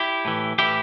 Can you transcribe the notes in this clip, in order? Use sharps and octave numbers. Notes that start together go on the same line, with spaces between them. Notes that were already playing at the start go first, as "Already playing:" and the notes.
Already playing: E4 G4
A2 E3
A2 E3 E4 G4